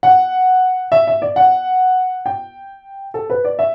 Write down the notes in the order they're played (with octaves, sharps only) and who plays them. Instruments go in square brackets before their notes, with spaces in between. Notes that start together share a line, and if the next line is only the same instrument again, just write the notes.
[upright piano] F#5
E5
E5
D5
F#5
G5
A4
B4
D5
E5